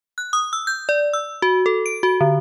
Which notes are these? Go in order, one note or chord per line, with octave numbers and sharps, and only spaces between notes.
F#6
D#6
E6
G6
D5
E6
F#4
A4
D7
F#4
D3